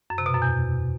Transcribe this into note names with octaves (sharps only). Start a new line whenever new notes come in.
F#2
C3
B2
F#2
E2